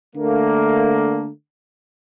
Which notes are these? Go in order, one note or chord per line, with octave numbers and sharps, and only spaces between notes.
D3 A3 A#3